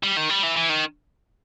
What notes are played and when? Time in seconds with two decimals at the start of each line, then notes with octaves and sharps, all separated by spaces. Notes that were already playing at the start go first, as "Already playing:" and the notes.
0.03 G3
0.17 D#3
0.30 G3
0.43 E3
0.56 E3
0.69 D#3